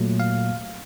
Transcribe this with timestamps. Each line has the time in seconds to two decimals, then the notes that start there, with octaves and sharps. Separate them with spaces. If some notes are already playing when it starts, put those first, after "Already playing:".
Already playing: A#2 F#3 A3
0.20 F5